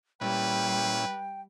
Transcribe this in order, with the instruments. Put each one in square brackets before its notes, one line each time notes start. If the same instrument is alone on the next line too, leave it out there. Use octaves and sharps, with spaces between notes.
[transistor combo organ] A#2 C#4 E4 [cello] G3 [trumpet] B4 [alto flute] G5